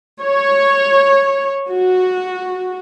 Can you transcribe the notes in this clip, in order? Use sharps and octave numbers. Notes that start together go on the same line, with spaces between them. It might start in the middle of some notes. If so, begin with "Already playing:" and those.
C#5
F#4